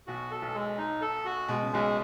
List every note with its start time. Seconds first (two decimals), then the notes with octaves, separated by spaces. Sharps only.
0.07 B1 B2 F#4
0.31 A4
0.42 B1 B2
0.54 G#3
0.78 D#4
1.01 A4
1.25 F#4
1.48 B2 G#3
1.62 C#3
1.72 B1 B2 G#3